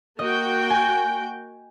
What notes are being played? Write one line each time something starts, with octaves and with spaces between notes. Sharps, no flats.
A#3 F#4 D#5 G5
G#5